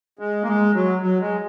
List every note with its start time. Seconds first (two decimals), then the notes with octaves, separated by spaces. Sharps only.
0.19 G#3
0.43 A#3
0.47 G#3
0.75 F#3
1.02 F#3
1.21 G#3